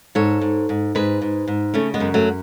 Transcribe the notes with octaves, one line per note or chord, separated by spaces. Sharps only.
G#2 A4 C#5
G#2
G#2
G#2 G#4 B4
G#2
G#2
C#3 A3 C#4
G#3 B3
F#2
F#3 A3